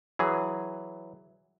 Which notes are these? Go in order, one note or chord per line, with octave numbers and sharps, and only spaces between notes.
E3 F#3 G#4